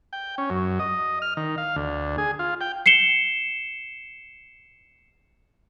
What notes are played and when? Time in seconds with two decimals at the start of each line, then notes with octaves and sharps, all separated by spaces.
0.13 G5
0.38 C#4
0.50 F#2
0.79 D#5
1.22 F6
1.37 D#3
1.58 F5
1.76 D2
2.18 G#4
2.39 F4
2.61 G5
2.86 C7 C#7 E7 G7